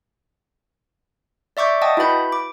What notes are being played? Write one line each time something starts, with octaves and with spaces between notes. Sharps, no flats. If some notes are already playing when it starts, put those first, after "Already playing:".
D5 E5 C#6 D6 G6
D#5 F#5 G5 A5 D#6
E4 F#4 B4 B5 G6
D6